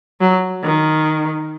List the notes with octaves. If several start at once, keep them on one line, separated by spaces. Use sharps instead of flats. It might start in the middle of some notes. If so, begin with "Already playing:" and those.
F#3
D#3